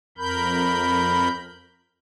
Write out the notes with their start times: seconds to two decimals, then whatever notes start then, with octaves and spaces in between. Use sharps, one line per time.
0.18 F2 A#4 B5 G6